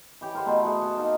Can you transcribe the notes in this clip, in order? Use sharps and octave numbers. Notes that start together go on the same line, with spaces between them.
E3 G4 C#5
A#4 C5 F#5
B2 A3 C5
F#4 G#4
F#5 A5
A#3 D#4 A#4